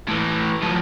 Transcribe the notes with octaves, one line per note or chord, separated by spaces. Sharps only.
A2 E3
F3 F#3